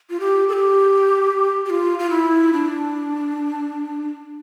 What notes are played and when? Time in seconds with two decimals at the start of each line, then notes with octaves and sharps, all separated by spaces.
0.10 F4
0.20 G4
0.48 A4
0.53 G4
1.66 G4
1.70 F4
1.99 F4
2.10 E4
2.53 D4